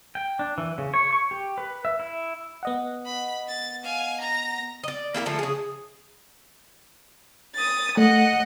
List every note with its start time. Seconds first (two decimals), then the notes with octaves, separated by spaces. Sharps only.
0.15 G5
0.39 D4
0.58 E3
0.78 C#3
0.94 C#5
1.13 C#6
1.31 G4
1.58 B4
1.85 E5
2.00 E4
2.63 B3 D#5 F#5
3.06 B5
3.48 A6
3.83 F5 G#5
4.21 A#5 A#6
4.84 D5 D#5
5.14 A#3 E4 G4 A#4
5.26 D3 F3 A3
5.39 C#3 G#4
7.55 D#6 A6
7.97 A3 D#5 F#5